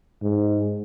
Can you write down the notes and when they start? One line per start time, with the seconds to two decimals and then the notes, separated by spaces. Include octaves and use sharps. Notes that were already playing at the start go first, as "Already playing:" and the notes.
0.22 G#2